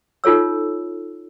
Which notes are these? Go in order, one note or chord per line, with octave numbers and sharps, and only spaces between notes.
D#4 F4 A4 C#5 E6